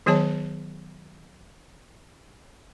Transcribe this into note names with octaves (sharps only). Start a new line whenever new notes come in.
D#3 F#3 B3 G#4 C#5 A5